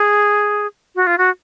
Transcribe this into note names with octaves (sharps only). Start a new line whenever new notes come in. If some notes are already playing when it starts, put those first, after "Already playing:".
Already playing: G#4
F#4
F4
F#4